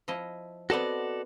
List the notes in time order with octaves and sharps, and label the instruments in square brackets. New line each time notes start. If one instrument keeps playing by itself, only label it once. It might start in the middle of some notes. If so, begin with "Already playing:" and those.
[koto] F3 E4 D#5
[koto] B3 C4 D#5 [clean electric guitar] F#4 A4 D5